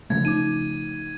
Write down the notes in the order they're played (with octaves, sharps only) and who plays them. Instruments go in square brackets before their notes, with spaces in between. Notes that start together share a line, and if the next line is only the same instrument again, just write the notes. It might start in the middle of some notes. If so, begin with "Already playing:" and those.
[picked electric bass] C#3 F3 A3 [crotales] G#6
[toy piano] D#4 D6 [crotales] D#7